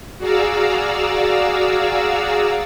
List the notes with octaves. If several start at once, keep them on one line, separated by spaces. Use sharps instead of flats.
F#4 G#4 D5 F5 A#5 E6